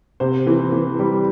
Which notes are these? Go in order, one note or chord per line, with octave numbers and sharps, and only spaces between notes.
C3 C5
E3
E3
G3